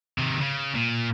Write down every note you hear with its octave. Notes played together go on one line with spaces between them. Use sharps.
C3 D#3
C#3
A#2